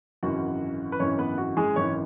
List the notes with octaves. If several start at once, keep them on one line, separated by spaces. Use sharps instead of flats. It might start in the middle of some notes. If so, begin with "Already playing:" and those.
G#1 F#2 C#3 E3 F#4 F#5
B4
G#1 F#2 C#3 E3 C#4 C#5
B3 B4
F#4
G#3 G#4
G#1 F#2 C#3 E3 C#4 C#5